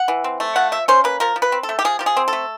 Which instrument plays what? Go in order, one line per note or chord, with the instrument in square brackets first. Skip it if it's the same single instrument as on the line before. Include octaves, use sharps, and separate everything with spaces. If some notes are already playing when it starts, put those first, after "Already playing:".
Already playing: [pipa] F#5
E3
C4
A3
F3 F#5
F3 E5
C#4 C5
A#3 B4
F3 A#4
F3
B4
C4
A4
A3
G4
F3 G#4
F3 G4
G#4
C4
A4
A3